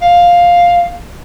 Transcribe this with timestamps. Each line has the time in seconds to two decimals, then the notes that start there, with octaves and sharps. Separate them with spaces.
0.02 F5